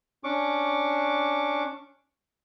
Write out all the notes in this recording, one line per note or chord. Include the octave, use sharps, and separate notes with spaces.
C#4 D4 C#6 D6